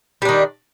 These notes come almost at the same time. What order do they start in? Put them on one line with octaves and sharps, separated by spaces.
G3 D4 D#3